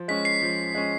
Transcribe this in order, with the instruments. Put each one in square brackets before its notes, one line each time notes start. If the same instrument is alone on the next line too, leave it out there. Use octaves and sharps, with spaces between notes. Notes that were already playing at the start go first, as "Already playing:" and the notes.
Already playing: [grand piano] F3
[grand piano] G#3 C#4 [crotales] B6
[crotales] C7
[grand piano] F3
G#3 C#4